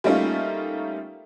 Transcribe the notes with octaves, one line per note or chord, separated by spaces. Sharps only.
G3 A3 A#3 C#4 D#4 F4